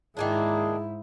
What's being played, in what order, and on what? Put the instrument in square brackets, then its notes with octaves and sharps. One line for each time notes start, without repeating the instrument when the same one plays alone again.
[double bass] G#2 E4 [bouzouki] D#3 A#3 D4 [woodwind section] G#4